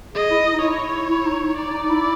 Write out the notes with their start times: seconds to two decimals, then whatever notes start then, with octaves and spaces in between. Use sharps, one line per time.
0.14 G#4 D#5
0.30 E4
0.53 D#4
0.62 E4 C#5
1.09 E4
1.25 D#4
1.57 D#4 D5
1.73 D#4
1.89 E4